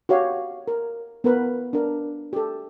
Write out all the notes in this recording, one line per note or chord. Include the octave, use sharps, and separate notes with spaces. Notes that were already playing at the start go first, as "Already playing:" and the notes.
F#4 G4 C#5 F5
A#4
B3 A#4 B4
D4 A#4
G4 A4